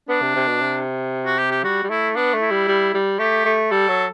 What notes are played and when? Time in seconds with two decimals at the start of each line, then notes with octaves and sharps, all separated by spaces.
0.09 B3 D4
0.22 C3
0.35 C3
0.48 B2
0.61 C3
1.26 F#4
1.38 G4
1.51 G4
1.64 G3 F#4
1.83 G3
1.90 A3 E4
2.16 B3 D4
2.34 A3
2.41 E4
2.51 G3
2.68 G3
2.94 G3
3.19 A3 G4
3.45 A3
3.71 G3 A4
3.88 F#3